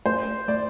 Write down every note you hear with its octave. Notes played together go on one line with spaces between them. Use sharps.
A3 C5
A3 D5